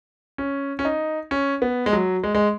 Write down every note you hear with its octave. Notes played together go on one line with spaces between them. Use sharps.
C#4
C#4
D#4
C#4
B3
G#3
F#3
G#3
G#3